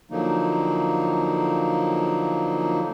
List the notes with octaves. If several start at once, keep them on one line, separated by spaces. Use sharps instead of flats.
D3 F3 F#3 A#3 D#4